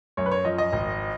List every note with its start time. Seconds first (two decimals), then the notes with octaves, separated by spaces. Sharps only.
0.17 F#2 C#5
0.26 B4
0.31 C#5
0.45 F3 D#5
0.58 D#5
0.73 G#1